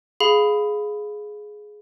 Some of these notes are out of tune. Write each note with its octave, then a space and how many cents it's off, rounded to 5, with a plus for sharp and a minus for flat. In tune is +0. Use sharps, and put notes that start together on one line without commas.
G#4 +10 F5 +0 B5 +10